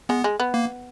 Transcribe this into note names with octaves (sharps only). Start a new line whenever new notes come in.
G#3 B3
G#3
B3
A#3